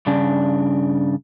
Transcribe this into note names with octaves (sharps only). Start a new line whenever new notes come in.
G2 C#3 D4